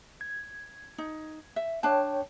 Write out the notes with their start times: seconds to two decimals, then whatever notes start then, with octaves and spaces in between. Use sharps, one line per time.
0.21 G#6
0.98 D#4
1.56 E5
1.83 D4 C#5 G5 A5